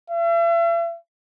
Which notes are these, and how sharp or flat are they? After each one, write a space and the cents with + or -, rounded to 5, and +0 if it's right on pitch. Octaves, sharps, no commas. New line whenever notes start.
E5 +45